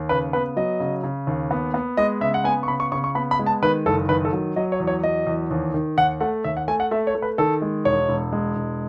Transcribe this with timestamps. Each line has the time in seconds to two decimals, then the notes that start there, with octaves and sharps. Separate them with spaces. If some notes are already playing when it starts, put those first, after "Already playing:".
Already playing: D#2
0.09 C#3 B4
0.33 B3 B4
0.56 F#3 D#5
0.80 C#3
1.03 C#3
1.27 D#2
1.51 B3
1.74 B3
1.97 G#3 D#5
2.21 C#3 E5
2.34 F#5
2.44 B3 G#5
2.63 C#6
2.68 C#3 B5
2.80 C#6
2.92 C#3 C#6
3.04 C#6
3.15 B3 B5
3.31 B5
3.39 G#3
3.46 A5
3.62 D#3 B4
3.86 F#1 A4
4.09 D#3 B4
4.25 A4
4.33 F#3
4.56 F#3 D#5
4.72 C#5
4.80 E2
4.87 C#5
5.03 F#3 D#5
5.27 E2
5.51 D#2
5.74 D#3
5.97 D#2 F#5
6.20 A3 F#5
6.44 D#2 E5
6.57 F#5
6.68 A3 G#5
6.80 F#5
6.91 A3 E5
7.07 C#5
7.15 A3
7.22 B4
7.38 D#3 A4
7.62 G#3
7.85 E1 C#5
8.09 E1
8.32 G#3
8.56 E1